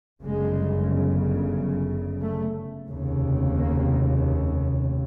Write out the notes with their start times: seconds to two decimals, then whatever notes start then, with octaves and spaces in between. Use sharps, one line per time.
0.22 G1 F#2 C#3 G#3
2.22 A3
2.88 F1 D#2 C#3
3.55 A#3